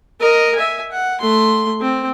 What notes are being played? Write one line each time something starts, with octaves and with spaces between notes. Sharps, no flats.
A#4 D#5
E5 G#5
F#5
A3 C6
C4